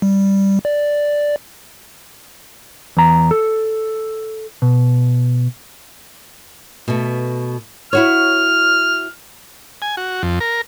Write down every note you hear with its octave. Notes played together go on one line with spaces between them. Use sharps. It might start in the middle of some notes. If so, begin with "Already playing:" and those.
G3
D5
E2 A#5
A4
B2
B2 A3
E4 F#4 C#5 F6
G#5
F#4
F2
A#4